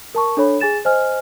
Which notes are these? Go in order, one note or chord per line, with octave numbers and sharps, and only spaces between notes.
A#4 A5 C#6
D4 A4 C#5 B5
G#4 G#5 A6 E7
C5 D#5 G#5 F6